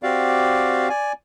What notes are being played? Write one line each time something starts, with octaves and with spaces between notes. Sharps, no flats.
C4 F#4 G4 D5 F5
D5 G#5